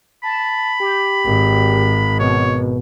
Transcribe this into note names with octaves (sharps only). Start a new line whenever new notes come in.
A5 B5
G4
G#1
B2 C#5